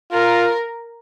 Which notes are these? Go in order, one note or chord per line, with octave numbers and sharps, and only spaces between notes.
F4 A#4